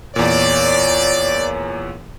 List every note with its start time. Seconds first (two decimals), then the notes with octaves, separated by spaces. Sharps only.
0.16 E2 A#2 A#3 C#5 D5